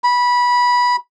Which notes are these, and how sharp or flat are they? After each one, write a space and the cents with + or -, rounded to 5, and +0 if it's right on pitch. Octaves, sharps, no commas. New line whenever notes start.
B5 -15